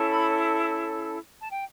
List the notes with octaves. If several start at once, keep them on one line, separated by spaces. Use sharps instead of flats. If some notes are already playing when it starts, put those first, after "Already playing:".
Already playing: C#4 E4 A4
B5
A5
G5